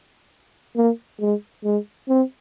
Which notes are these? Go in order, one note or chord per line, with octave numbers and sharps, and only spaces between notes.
A#3
G#3
G#3
C4